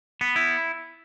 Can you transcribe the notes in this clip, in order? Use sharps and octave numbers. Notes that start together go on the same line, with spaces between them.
B3
E4